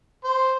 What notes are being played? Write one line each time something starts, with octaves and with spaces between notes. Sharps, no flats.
C5